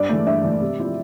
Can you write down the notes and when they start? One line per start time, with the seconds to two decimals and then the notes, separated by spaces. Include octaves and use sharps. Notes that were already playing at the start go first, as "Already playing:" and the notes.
Already playing: G2 D5
0.09 E3 A3
0.26 G2 E5
0.44 E3 A3
0.61 C3
0.79 F3 C4 E4